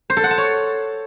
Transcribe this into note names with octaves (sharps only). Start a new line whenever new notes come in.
C5
A4
F#5
A5
C#5